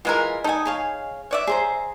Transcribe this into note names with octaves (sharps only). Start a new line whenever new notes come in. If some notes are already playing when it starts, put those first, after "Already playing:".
E3 G#3 F4 A#4 G#5 A#5
D#4 A4 G#5 D#6
G#4 C#5 F5
C#5 D5 E5
G#4 C5 A#5